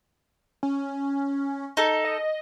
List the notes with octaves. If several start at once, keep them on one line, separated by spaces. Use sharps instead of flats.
C#4
D#4 A4
D#5